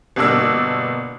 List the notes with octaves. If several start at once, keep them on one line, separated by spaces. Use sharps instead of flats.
G1 B2 A#3 D4 D6 E6